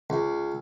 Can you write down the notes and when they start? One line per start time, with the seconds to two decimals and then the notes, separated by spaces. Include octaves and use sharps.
0.10 C#2